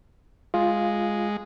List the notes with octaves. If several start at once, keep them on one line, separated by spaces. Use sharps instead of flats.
G#3 F4